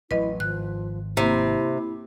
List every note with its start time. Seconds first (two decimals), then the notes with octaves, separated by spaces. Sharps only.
0.11 A1 F#3 E4 B4 D#5
0.40 G#1 F3 F#6
1.17 C3 A#3 C4 E4